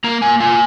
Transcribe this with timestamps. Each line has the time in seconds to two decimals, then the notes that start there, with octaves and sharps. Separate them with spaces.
0.04 A#3 A#5
0.22 A#3 G#5
0.40 F4 G#5